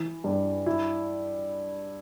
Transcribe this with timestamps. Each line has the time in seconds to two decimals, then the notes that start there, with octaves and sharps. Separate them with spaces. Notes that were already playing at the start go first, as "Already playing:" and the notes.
Already playing: E3
0.24 G2
0.66 E4